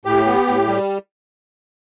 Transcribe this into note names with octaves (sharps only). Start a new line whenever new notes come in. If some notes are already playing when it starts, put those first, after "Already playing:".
A2 G4
B3
A2
G3